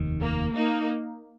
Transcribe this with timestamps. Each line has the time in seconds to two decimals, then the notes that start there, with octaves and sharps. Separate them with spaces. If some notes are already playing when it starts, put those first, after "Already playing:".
Already playing: F1 D#2 D#3
0.21 A#3
0.55 A#3 D#4